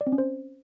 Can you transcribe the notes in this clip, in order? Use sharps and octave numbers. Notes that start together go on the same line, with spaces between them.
D5
C4
C#4
C5